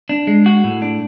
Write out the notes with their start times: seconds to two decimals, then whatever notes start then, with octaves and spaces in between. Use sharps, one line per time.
0.09 D4
0.27 G#3
0.46 F#4
0.64 A2
0.82 D4